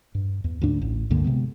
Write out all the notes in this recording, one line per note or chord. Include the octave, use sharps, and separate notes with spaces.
G2
E2
D2 G#2 D4
A1
C#2 G2 D3 A#3
C3 G#3 B3